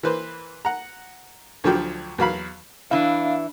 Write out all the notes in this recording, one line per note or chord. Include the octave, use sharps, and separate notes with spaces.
E3 A#3 B4 C5
F#5 A#5
D2 D3 F3 F#3 G4
E2 F#3 F5 B5
E3 D4 E4 F5